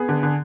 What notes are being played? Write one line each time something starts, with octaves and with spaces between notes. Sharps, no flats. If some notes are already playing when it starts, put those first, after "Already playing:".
Already playing: B3 G#4
D3
D3